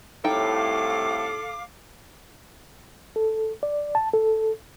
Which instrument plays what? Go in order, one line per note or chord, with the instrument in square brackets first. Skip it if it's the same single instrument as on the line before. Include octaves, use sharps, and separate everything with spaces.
[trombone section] C2 A2 [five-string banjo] D#4 E4 G5 [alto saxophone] A4 [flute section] F5 D6
[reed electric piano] A4
D5
A5
A4